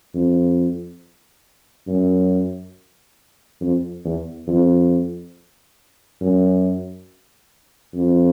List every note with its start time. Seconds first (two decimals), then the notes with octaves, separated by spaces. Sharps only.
0.15 F2
1.87 F#2
3.61 F2
4.05 E2
4.48 F2
6.21 F#2
7.94 F2